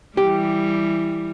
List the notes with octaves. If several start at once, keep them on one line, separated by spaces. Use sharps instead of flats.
E3 G3 G4